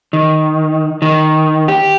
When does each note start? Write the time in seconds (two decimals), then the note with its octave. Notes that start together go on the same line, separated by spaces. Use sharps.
0.13 D#3
1.02 D#3
1.68 G4